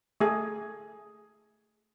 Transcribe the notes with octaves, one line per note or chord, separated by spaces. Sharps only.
A3 G#4